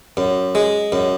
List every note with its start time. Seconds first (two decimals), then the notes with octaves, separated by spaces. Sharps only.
0.17 F#2
0.55 G#3
0.92 F#2